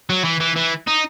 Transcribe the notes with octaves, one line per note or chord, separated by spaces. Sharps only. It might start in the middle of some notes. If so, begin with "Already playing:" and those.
F#3
E3
E3
E3
D#4